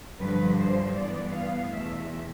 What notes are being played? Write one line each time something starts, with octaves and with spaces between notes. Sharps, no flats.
G2 D3 F3 B4
C5
G2 E3 B3 D5
F5
E2 B2 A3 E5